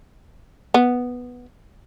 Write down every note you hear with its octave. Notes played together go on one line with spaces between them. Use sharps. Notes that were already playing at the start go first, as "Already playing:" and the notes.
B3